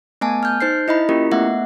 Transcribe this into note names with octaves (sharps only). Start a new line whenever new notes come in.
A3 B3 G#5 A5
F6 G6
D#4 C5 G6 C7
E4 D#5 E5 B5
A#3 C#4 E4 F4 G4 A#4
A3 B3 E5 F#5